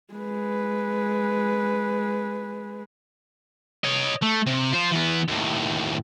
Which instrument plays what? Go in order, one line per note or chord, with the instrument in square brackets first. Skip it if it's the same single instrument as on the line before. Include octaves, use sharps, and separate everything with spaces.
[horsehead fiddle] G#3 B4
[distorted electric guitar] C#5 D#5
A3
C3
F4 C5
E3 B3
D#2 A2